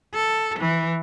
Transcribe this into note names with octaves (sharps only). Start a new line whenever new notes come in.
A4
E3